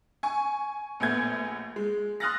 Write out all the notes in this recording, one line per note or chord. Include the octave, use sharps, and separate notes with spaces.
G#5 C#6
A#1 A3 B3 G6 G#6
G#3
C6 D#6 F6 F#6 A6 A#6